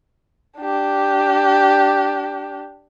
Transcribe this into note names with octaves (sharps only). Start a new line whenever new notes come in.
D4 G4